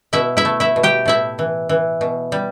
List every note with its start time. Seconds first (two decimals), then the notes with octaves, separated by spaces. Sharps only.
0.13 B2 E4 E5
0.37 E4 E5
0.45 A3
0.60 E4 E5
0.76 B2
0.83 G4 G5
1.06 A2 E4 E5
1.39 E3
1.69 E3
2.01 B2
2.32 G3